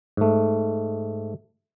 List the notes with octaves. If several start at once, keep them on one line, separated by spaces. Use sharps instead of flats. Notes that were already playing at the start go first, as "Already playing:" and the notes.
G#2 A3